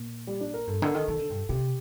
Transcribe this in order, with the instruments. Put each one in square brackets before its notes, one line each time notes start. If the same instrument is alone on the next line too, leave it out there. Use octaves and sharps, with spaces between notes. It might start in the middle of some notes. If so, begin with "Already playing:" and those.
Already playing: [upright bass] A#2
[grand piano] G3
D4
A#4
[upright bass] G2 [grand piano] A4
[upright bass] D3 [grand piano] A#4
[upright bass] D#3 [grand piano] A4
[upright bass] D#3 [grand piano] A4
[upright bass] D3
G2
[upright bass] C3 [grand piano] G4